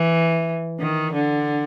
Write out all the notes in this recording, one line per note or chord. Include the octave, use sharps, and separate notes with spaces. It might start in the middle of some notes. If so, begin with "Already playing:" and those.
Already playing: E3
D#3
D3